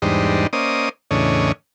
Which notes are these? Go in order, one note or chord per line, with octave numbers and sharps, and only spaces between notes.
E2 G#2 G3 D4 D#4 C5
A#3 C#4 C5 D5 D#5 D#6
E2 A2 C#3 D4 C#5 D#5